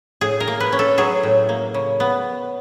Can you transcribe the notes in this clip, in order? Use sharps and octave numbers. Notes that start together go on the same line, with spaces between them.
A2 G#4
A#4
A#3
B4
C#4
A4
F#3 G#4
A2
A#3
C#3
B3